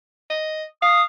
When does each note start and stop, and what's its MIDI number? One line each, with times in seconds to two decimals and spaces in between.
0.30 0.63 75
0.82 1.02 77
0.82 1.03 87